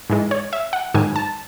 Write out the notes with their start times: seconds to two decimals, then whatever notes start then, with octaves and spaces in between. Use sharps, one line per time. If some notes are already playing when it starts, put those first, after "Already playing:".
0.10 G#2 E3 G#3
0.31 C#5
0.53 E5
0.73 F#5
0.94 G#2 D#3 F#3 G#5
1.16 A5